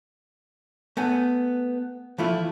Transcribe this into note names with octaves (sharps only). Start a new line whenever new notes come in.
A3 B3 G#5
E3 F3 A3 E4 F4